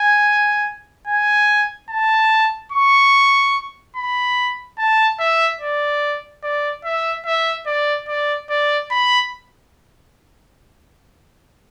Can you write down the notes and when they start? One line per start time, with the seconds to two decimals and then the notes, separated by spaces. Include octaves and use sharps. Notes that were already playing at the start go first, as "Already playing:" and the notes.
Already playing: G#5
1.07 G#5
1.90 A5
2.72 C#6
3.96 B5
4.78 A5
5.19 E5
5.61 D5
6.43 D5
6.84 E5
7.26 E5
7.66 D5
8.08 D5
8.50 D5
8.91 B5